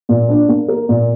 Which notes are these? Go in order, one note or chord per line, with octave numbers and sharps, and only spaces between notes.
A#2
D4
A#3
A#4
A#2